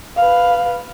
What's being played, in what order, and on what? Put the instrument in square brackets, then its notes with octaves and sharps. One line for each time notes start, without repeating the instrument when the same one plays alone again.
[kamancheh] B4 F5